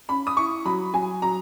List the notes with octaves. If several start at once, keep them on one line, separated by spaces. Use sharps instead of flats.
C#4 B5
D#6
E4 C#6
F#3 B5
F#3 G#5
F#3 A#5